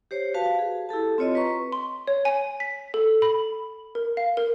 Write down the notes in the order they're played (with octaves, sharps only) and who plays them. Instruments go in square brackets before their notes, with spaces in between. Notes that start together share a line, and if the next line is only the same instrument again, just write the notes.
[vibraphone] G4 C5 C#5
F#4 B4 F5 A5
G#4
E4 G4 A4 A5
C4 F4 C#5 D#5
B4 A#5 C#6
[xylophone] C6
C#5
G#5
B6
A4
B5
A#4
F5
A#4